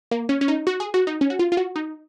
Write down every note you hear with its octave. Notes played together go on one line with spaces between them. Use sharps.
A#3
C#4
C#4
D#4
F#4
G#4
F#4
D#4
C#4
F#4
F4
F4
F#4
D#4